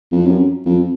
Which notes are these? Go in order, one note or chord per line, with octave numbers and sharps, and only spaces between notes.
F2
F#2
F2